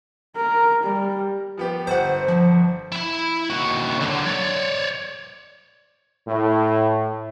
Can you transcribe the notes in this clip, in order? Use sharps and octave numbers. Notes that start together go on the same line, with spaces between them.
A#4
G3
F3 B3 G4
G1 C5 F#5
F3
E4 B5
D#2 F#4
D3 F#3
C#5 D5
A2